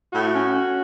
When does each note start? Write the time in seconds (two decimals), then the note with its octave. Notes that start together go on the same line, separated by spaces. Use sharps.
0.13 A2 F#4
0.33 C#4
0.53 C#4